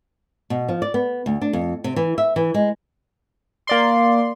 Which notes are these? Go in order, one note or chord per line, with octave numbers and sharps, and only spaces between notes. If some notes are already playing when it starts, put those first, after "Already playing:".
B2
F3
D5
B3
D2
D4
F2
C3
E3
E5
E3
G#3
A#3 D5 C6